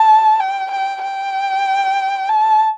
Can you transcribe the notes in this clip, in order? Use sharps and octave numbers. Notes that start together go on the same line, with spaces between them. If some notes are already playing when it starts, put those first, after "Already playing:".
Already playing: A5
G5
G5
G5
A5